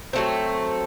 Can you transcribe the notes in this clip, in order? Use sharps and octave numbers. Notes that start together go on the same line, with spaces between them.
F#3 A3 C4